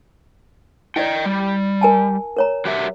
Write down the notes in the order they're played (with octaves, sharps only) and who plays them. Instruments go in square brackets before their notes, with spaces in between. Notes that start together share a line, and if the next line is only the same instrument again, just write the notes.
[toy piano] E4 D5 [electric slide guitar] D#5 G5
[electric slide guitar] G3
[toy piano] A#4 G#5 A5
A#4 C#5 A#5
[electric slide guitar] F#3 G4 E5